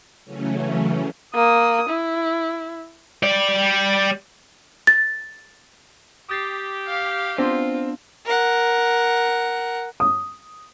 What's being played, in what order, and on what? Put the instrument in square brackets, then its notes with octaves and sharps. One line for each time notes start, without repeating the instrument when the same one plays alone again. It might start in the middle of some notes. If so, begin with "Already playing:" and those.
[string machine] C#3 E3 F#3 A3 C#4
[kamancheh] A#3 D#6
E4
[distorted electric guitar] G3 D5
[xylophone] A6
[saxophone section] G4 [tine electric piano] D#6 A6 C7
[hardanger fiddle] F5
[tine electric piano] B3 D4 [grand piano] C4 [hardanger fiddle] F4
[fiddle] A#4 F#5
[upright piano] D#6